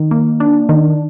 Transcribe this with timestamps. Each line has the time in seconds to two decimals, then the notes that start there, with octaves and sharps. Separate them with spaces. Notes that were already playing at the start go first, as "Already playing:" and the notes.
Already playing: D#3
0.11 A#3
0.40 D4
0.69 D#3